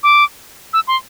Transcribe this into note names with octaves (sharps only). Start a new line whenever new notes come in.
D6
E6
C6